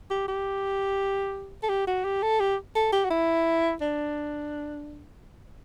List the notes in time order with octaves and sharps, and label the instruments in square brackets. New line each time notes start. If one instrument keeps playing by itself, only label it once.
[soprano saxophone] G4
G4
A4
G4
F#4
G4
A4
G4
A4
G4
F#4
E4
D4